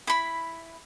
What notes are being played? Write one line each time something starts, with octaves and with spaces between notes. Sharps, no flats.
E4 B5